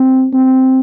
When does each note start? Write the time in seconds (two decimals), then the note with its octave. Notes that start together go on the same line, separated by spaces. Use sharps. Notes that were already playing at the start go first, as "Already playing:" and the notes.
Already playing: C4
0.33 C4